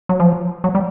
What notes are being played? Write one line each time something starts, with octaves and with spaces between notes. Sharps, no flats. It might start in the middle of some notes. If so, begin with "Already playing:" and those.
F#3
F3
F#3
G3